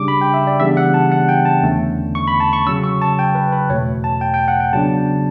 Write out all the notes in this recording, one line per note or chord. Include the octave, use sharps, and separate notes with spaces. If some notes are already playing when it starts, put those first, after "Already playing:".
Already playing: C#3 G3 D4 D6
B5
G5
E5
D5
C#3 E3 G3 B3 D4 E5
F#5
A5
F#5
G5
A5
E2 D3 A3 C#4
C#6
B5
A5
C#6
C#3 F#3 C#4 E6
C#6
A5
G5
B4
B4
E2 B2 A3 C#5
A5
G5
G5
F#5
G5
C#3 F#3 B3 D4 A5